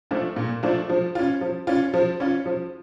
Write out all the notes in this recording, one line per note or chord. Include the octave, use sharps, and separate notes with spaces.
F3 A3 D4 F4
A#2
F3 A3 D4 F4
F3
C#4 F4
F3
C#4 F4
F3
C#4 F4
F3